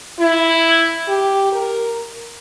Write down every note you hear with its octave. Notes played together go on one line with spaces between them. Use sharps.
E4
G4
A#4